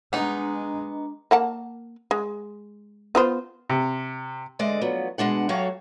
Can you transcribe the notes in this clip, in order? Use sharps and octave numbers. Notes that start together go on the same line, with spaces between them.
G#3 B3 D4 D#4 D#5 A#5
A#3 F#5 A5
G#3
B3 F4 C5
C3
D3 G#3 D5 D#5
F3 F#3 B3
B2 G#3 D4 F#5
F#3 F#4 G4 A4 C#5 F5